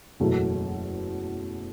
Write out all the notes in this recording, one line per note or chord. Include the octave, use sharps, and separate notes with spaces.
F#1 E2 B2 F#3 A3